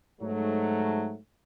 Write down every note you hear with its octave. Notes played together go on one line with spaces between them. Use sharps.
G#2 F#3 A3